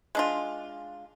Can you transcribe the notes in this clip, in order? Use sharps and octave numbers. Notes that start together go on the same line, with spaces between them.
G#3 D4 F4